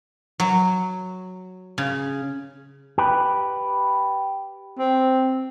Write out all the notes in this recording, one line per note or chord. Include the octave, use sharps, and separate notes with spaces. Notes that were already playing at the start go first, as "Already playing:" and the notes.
F#3
C#3
G4 B4
C4